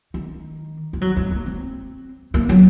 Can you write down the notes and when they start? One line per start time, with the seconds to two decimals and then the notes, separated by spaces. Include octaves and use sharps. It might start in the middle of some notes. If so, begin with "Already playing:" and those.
0.14 D#3
0.93 G#3
1.01 F#3
1.17 G#3
1.31 A#3
1.46 C4
2.34 A#3
2.49 F#3